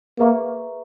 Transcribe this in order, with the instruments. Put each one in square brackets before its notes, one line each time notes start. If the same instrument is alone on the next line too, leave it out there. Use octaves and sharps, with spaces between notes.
[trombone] A#3 [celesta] G#4 B4 E5 A#5 C#6